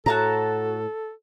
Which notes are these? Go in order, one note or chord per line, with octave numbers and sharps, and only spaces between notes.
A2 F#4 A4 A5 A#5